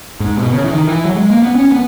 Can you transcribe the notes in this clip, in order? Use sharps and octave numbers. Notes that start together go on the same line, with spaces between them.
G#2
B2
C#3
E3
D#3
E3
F#3
G#3
A#3
B3
C#4
B3